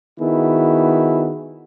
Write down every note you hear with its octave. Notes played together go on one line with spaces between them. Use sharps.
D#3 B3 E4 F#4 G#4